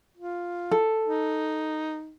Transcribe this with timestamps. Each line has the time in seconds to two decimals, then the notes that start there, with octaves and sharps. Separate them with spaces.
0.17 F4
0.71 A4
1.05 D#4